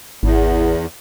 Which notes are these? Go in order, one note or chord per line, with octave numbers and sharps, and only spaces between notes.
G#1 E2